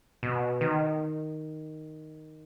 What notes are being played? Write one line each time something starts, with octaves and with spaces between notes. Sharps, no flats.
B2
D#3